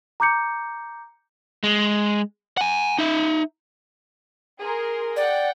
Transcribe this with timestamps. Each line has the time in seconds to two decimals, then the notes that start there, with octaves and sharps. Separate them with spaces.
0.20 A#5 D6 G6 C#7
1.63 G#3
2.57 F#5 G#5
2.98 D#4 E5
4.59 G#4 A#4 C6
5.16 D5 F#5 G5